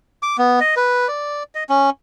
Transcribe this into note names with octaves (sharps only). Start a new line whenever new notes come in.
D6
B3
D#5
B4
D5
D#5
C#4